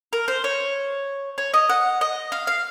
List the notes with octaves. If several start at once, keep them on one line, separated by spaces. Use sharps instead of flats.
A#4
C5
C#5
C#5
D#5
F#5
D#5
F5
F5